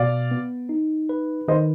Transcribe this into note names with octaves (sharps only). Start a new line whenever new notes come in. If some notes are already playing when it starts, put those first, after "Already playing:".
Already playing: B2 D5 F5
B3
D#4
B4
D#3 C5 D#5